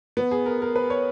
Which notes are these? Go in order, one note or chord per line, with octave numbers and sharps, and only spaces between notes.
B3
G#4
A#4
A#4
B4
C#5